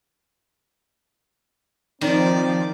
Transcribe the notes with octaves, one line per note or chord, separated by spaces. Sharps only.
D#3 F3 C4 D5